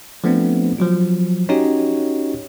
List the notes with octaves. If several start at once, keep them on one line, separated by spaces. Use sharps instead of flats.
F3 A3 B3 C4 D4
F3 F#3 F4
C#4 D#4 F#4 G4 C#5